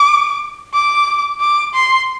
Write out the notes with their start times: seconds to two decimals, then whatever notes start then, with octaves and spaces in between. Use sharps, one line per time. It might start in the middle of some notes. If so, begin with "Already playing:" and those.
Already playing: D6
0.74 D6
1.40 D6
1.74 C6